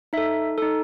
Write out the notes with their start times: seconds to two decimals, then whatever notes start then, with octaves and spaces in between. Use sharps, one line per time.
0.13 D#4 A4 E5
0.58 D#4 A4